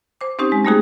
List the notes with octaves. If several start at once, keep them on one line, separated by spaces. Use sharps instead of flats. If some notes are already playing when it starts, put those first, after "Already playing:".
C5 D6
C4 C#4 D#4 G4 C5
G#3
G3 A3 A#3 D#4 F#4 G#4